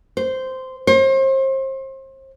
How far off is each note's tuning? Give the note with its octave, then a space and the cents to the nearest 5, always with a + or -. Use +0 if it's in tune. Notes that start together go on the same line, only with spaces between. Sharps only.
C5 -10
C5 +35